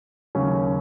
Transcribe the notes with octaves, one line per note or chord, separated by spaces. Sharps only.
D#2 C#3 F#3 C#4